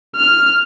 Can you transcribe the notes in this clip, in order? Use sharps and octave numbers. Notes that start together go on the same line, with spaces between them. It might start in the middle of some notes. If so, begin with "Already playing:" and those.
F6